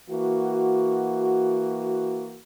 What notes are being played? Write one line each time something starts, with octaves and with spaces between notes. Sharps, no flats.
E3 A#3 F#4